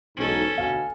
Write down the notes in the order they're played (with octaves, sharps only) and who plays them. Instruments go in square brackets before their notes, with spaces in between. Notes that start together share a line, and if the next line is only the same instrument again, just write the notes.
[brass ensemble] B1 E2 G#2 [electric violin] C#4 A4
[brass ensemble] D2 B2 [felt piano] F5 G#5